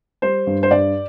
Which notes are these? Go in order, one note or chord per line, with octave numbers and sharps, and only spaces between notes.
G3 C5
G2
C5
G2 D5